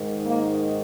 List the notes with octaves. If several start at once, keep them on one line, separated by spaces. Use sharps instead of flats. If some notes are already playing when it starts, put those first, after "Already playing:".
Already playing: G#2 D#3
A#3